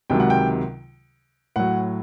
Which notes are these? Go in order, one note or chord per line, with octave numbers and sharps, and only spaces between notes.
C#2 C3 D#3 F#3 G5
F#5
G5
A2 F#3 F#5